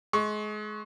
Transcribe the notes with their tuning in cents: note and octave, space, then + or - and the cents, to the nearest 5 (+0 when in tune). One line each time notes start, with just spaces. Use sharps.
G#3 +30 C#6 +0